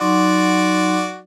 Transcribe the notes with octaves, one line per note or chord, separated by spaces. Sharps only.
F#3 D#4 F#4 D5 C6